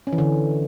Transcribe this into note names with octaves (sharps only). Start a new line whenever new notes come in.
C#4
E3
D3